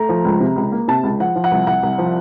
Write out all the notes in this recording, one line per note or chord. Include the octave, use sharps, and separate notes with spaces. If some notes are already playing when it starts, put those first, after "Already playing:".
Already playing: A3 A#5
F3
C#2
C3
C#2
A#3
C3 A5
C#2
F3 F#5
F3
F#5
C2
C2 F#5
C2
F3